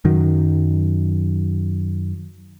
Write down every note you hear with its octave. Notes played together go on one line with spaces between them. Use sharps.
F#2 D#3 F#3